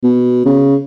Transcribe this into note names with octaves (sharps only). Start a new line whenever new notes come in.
B2
C#3